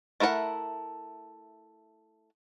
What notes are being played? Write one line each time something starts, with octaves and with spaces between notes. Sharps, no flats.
A3 E4 A#4 B4 F#5